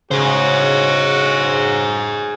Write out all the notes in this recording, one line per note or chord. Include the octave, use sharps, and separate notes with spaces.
C#3 F#4 G#4 C5